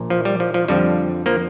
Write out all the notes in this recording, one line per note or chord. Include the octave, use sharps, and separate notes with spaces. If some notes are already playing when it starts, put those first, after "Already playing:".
Already playing: A#1 A#2
F3
G3
F3
F3
F2 D3 F3 G3
F3 A#3